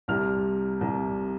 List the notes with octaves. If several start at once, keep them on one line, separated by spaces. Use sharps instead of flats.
C2 C3 G3 F6
C2 C3 G3